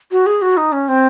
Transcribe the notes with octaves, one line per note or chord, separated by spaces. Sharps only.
F#4
G#4
F#4
D#4
C#4
C4